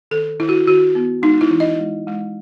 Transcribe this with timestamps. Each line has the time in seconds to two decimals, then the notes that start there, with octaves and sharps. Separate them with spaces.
0.11 D#3 A4
0.39 D#3 E4
0.49 F#4
0.67 D#3 F#4
0.95 B3
1.22 G#3 D#4
1.41 E4
1.51 E3
1.60 D#5
1.79 G#3
2.07 G#3